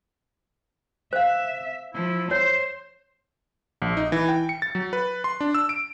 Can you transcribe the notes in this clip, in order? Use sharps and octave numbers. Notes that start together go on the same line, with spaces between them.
C5 E5 F5
F3 E4
C5 C#5 C6
A#1
D#4
E3
G5
C#7
A6
F#3
B4
C6
D4
E6
D7